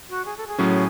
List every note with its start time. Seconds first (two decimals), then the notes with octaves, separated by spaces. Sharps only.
0.09 F#4
0.25 G#4
0.37 A4
0.47 G#4
0.58 A2 F#3 C#4